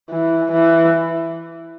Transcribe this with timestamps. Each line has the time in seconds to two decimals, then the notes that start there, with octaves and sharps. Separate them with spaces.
0.10 E3
0.52 E3